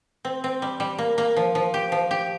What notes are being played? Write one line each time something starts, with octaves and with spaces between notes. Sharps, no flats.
C4
C4
G3
G3
A#3
A#3
F3
F3
G4
F3
G4